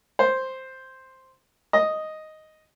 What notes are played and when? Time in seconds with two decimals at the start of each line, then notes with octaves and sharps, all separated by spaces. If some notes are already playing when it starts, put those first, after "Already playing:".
0.19 C5
1.73 D#5